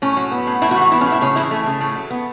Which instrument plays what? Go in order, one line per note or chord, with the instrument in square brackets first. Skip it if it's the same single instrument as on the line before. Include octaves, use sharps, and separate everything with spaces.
[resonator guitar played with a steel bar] A2 C#4
F#3
B3
A2
A2 E4
F#4
E3
F#4
B3 E4
C#4
A2
E4
C#3 C#4
E3 E4
A3
C#3
A2
F#3
B3